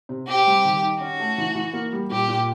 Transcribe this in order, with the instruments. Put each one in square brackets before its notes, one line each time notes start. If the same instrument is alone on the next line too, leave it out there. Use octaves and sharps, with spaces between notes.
[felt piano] C3
[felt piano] C4 [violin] G4
[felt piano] G3
D#3
D#4
[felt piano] C#4 [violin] F#4
[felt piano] A3
E3
E3
A#3
G3
[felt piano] A#2 [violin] G4
[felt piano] A#2